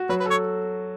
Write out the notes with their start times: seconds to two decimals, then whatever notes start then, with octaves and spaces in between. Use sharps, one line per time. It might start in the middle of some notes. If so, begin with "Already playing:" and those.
Already playing: F#4
0.09 F#3 B4
0.20 B4
0.26 A4 C#5